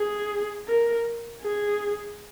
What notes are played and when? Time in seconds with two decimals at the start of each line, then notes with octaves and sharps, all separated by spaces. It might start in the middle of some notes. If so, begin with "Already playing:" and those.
Already playing: G#4
0.68 A#4
1.42 G#4